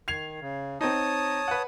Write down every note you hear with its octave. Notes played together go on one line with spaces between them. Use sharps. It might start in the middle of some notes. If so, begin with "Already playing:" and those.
D#3 G#6 C7 F7
C#3
C4 D#4 C#5 A5 D#6
B4 F#5